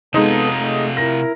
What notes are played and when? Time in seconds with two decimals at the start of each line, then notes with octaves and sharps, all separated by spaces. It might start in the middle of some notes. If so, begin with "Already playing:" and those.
0.14 C3 G#3 B3 D#4 F4 A4
0.56 A3
0.97 E4 A#4 A#6